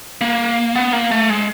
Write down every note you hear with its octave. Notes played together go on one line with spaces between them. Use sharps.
A#3
B3
A#3
A3
G#3